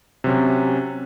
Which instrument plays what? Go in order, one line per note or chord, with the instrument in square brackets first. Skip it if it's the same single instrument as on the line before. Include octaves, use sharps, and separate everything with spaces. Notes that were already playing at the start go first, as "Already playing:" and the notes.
[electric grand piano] C3 F#3 C#4